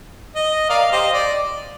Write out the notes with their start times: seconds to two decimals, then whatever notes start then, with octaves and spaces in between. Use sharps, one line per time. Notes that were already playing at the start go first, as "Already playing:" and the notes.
0.36 D#5
0.70 A#4 D5 F5
0.92 G4 C5 D#5
1.14 D5